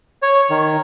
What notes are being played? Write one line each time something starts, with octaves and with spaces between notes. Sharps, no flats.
C#5
D#3